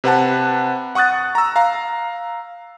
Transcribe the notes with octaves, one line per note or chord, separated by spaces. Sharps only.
C3 B4 F#5 A5
F#5 C#6 D#6 F#6 A6
A#5 E6
F5 A#5